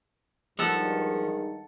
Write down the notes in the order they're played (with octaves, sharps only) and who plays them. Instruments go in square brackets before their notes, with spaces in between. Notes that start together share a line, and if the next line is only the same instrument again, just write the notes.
[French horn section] G2 D#3 G#3 [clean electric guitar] F3 [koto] A4 F#5